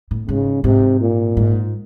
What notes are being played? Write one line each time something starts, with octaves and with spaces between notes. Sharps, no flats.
A2
G#2 C#3
G#2 C3
A#2
G#2